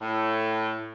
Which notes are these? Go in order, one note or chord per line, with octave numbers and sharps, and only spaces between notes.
A2